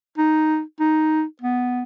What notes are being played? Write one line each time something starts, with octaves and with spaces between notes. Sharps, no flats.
D#4
D#4
B3